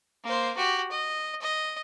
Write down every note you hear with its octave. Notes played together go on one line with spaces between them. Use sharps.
A#3 C5
F#4 G4
D#5
D#5